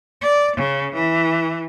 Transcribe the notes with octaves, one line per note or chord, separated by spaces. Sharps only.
D5
C#3
E3